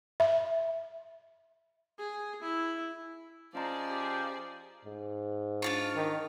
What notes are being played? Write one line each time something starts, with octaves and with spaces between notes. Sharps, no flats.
E5
G#4
E4
F3 C#4 G#4 D5 D#5 A#5
G4
G#2
D4 F4 C#5
D#3